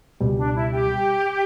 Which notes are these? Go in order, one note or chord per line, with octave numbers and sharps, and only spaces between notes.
C#2 B2 G3
D4
E4
G4